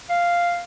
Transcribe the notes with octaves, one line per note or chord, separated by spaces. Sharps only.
F5